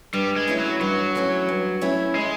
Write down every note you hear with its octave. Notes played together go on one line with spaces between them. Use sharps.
G2 G3
G#3
E3 A3 C#4 E4
F#3
G2 F#3
E3 A3 C#4 E4
G2
E3 A3 C#4 E4
G#3